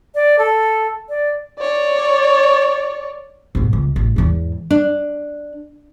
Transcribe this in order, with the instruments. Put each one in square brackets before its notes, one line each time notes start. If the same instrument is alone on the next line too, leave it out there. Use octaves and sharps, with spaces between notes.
[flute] D5
A4
D5
[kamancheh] C#5 D5
[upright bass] G#2 B2
C#2
A1
E2 G#2
[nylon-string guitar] D4